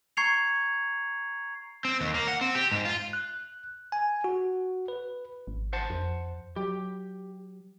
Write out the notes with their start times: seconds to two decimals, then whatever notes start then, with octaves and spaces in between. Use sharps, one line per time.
0.17 A#5 C#6 G#6 C7 C#7 F7
1.85 C4
2.01 D#2
2.14 A#3
2.28 F#5
2.41 C4
2.55 G4
2.72 G#2
2.85 F4
3.13 F#6
3.92 G#5
4.24 F#4
4.88 B4
5.47 G#1
5.73 C5 F#5 A5
5.90 F2
6.56 F#3 G4